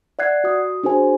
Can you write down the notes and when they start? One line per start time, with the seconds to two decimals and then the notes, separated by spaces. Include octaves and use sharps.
0.19 D5 E5 F#5 F#6 G#6 C7
0.44 F#4 D#6
0.83 D4 F#4 G#4 C5 G#5